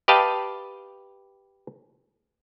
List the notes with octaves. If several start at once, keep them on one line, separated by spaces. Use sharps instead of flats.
G4 B4 D#5 F5 G5 A5